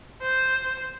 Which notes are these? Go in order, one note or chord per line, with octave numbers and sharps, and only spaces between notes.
C5